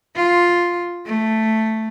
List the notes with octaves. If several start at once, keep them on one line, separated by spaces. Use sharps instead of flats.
F4
A3